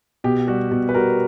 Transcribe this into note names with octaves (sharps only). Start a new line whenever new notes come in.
B2 G4
G3 F#4
B2 F#4
B4
G3 F#4 A#4